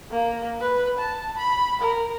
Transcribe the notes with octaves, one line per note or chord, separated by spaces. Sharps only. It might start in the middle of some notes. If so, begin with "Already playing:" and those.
A#3
B4
A5
B5
A#4